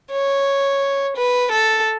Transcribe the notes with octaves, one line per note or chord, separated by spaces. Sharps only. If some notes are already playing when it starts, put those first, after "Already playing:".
C#5
B4
A4